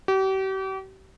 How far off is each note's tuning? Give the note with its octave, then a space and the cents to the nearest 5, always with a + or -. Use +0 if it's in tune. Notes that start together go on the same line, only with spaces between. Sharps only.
G4 -40